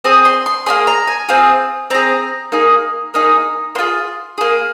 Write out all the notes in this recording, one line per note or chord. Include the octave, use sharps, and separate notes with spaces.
C4 G#4 D#6
C6
C6
A#3 D#4 G#4 C6
A#5
G#5
C4 F4 G#4
C4 G#4 A#5
A#3 D#4 G#4
A#3 D#4 G#4
A#3 F4 G#4 C6
A#3 G#4